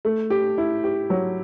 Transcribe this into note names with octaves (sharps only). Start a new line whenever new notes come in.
A3
G4
E4
G4
F#3